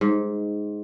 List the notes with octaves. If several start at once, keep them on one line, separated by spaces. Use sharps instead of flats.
G#2